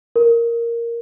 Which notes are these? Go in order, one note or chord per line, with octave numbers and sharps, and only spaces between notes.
A#4